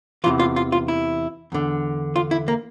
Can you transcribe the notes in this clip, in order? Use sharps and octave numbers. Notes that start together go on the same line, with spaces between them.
E2 C3 E3 F4
F4
F4
F4
E4
E2 D3
F4
E4
A#3